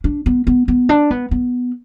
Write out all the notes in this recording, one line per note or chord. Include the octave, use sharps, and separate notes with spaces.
D4
B3
B3
B3
D4
B3
B3